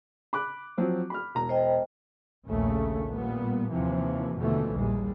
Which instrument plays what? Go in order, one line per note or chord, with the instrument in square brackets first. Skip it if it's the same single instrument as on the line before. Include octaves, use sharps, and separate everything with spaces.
[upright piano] B5 D6 F#6
F3 F#3 C4
B5 F6
E1 A#5
[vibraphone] C5 D#5 G5
[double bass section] A#1 D#2 C#3 A3 C#4
A#2 G3 B3
D#2 C3 E3 F3
D#2 B2 D3 E3 F3 A3
A#1 D#2 G3 G#3